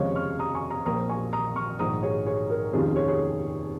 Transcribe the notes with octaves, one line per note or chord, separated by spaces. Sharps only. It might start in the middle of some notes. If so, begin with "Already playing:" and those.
Already playing: F1 D#2 C#3 F3 G#3 C#5 F5
C#6 F6
A#5 D#6
G#5 C#6
A#5 D#6
A#1 A#2 F3 A#3 A#5 D#6
G#5 C#6
A#5 D#6
C#6 F6
A#1 G#2 D#3 A#5 D#6
G#4 C#5
G#4 C#5
A#4
F1 D#2 D#3 C#4 F4 G#4
G#4 C#5
G#4 C#5